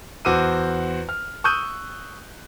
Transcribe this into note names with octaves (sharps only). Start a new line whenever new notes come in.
E2 F#4 C5 D6 E6 D#7
F6
C#6 D#6 E6 F#6 G6 D#7